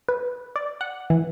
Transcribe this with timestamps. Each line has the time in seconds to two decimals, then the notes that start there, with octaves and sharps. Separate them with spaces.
0.09 B4
0.56 D5
0.81 F#5
1.10 E3